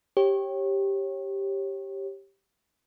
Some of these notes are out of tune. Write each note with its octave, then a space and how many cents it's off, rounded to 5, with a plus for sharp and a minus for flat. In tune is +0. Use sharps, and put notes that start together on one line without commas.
G4 +0 C#5 -25